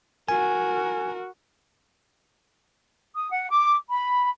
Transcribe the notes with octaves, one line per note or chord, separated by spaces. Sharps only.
F#4 A#4 G#5
D#6
F#5
D6
B5